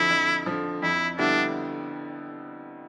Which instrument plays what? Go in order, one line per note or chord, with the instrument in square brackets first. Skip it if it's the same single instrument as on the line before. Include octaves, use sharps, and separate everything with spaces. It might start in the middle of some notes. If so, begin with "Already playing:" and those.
Already playing: [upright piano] F2 D3 F3 [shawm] E4
[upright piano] F2
D3 F3
[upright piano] F2 [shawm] E4
[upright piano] D3 G3 B3 E4 [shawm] D4